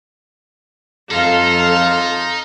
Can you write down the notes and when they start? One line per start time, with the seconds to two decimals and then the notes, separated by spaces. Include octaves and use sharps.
1.11 F2 D#4 F4 A4 F5 A#5